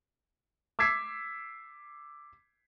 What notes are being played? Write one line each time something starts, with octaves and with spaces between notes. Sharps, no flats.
D6 E6 G#6 B6 C7